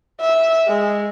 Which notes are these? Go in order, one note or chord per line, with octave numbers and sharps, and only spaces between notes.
E5
G#3